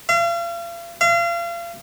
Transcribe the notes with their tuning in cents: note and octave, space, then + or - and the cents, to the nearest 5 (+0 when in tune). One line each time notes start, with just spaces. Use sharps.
F5 -40
F5 -35